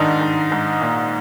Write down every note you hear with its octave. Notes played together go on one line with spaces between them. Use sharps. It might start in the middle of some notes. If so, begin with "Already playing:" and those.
Already playing: G#2 D#3 D4 D#4
G#2
G#2
A#2